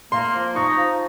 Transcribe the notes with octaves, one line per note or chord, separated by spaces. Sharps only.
A#3 C6
F3
D#4 C#6
F3